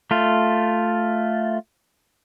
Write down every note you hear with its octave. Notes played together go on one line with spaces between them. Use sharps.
A3 F4